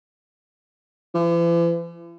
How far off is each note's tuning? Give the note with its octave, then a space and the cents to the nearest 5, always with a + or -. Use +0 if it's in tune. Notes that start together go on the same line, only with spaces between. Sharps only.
E3 +45